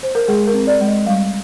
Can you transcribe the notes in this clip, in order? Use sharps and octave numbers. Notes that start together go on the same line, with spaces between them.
C5
A#4
G#3 G#4
A#4
C4
D5
G#3
D#5
G3 F5